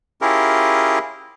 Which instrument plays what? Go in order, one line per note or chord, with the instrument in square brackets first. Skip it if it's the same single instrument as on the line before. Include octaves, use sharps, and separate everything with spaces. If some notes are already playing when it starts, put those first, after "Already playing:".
[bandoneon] C#4 E4 F4 G4 G#4 A#4